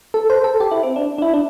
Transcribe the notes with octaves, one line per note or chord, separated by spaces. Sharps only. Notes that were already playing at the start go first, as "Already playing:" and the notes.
A4
C5
A4
G4
E4
C4
D4
D4
E4
D4